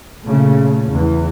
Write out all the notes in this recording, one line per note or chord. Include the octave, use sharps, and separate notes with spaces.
A#2 C#3 A3
E2 E3